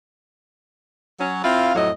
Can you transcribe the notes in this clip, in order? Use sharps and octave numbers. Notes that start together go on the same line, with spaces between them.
F#3 C#4
C4 E4 F4 F5
F2 A2 F#3 D#5